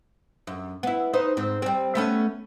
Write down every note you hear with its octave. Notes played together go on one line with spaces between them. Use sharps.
F#2
B3 E4
D#4 B4 C5
G#2 C4
G3 C4
A3 B3 C#4